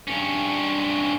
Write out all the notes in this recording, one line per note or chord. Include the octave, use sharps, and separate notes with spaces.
G2 C#4